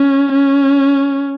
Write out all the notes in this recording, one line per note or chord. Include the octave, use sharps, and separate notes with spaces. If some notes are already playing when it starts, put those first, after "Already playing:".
Already playing: C#4
C#4